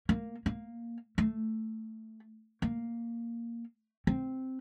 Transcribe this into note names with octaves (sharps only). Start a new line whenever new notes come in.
A#3
A#3
A3
A#3
C4